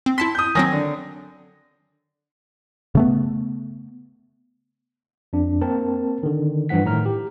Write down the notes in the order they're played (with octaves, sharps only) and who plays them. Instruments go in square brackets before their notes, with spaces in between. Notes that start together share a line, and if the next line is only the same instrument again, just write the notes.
[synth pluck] C4
[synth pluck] E4 A5 C6 [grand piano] B6
[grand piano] D#6 G6
[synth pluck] D#3 F#3 C4 [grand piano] G#5 D#6 A#6
[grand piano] D3
[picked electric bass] C#3 A3 B3
[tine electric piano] F2 D4
A#3 C4 A#4 A5
D3 D#3
G2 E3 F3 F#5 B6
A2 D#3 A#5 F6
G4